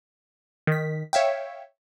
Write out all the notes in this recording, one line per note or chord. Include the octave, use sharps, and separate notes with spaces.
D#3 B6
C#5 E5 F5 G5